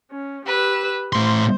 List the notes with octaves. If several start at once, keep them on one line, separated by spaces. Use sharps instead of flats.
C#4
G4 B4 E6
A2 C5 C6